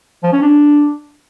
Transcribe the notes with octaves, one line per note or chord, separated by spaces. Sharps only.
F3
C#4
D4